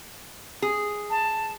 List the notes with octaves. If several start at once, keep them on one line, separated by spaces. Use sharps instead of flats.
G#4
A5